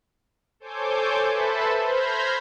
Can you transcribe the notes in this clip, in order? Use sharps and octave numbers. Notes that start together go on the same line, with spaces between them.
A4 C5 C#5 G#5 D6 G6
A4 B4 C5 E5 A5 B5
C5 B5 F6 G6 G#6 A#6